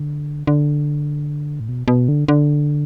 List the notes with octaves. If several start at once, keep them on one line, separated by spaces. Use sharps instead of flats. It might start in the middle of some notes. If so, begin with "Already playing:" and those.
Already playing: D3
D3
A2
B2
B2
D3
D3